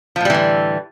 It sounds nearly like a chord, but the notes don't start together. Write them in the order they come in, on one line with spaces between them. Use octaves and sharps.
F3 A2 G3 E3 D3